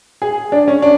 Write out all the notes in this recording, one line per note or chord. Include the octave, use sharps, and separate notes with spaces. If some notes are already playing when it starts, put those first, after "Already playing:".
G#4
D4
C#4
D4